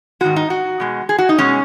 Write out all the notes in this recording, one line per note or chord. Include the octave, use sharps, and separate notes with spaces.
G#2 D#3 G#3 F#4
D#4
F#4
B2 G#3
G#4
F#4
D#4
B2 G#3 C#4